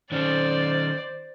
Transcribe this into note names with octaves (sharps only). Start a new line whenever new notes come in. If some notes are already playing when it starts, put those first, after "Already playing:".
D#3 C#4 C5 D5